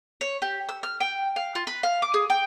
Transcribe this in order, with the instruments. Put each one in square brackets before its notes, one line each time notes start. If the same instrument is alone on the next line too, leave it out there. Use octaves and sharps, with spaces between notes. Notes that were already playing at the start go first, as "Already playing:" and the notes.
[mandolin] C#5
G4
E6
F6
G5
F5
F4
B4
F5
D6
G#4
G5